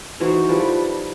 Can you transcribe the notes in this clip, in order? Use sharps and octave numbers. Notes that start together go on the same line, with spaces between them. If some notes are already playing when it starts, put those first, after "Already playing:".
E3 D#4 F#4 C5
F3 G3 A4 B4